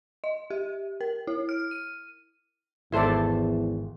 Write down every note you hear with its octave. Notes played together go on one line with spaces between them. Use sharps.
D#5
G4
A#4
E4
F6
D#7
G#1 E2 E4 A4 C5 D5